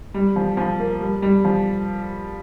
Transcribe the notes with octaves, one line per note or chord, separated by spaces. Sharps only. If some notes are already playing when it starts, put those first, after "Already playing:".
G3
F3
F3
A#3
G3
G3
F3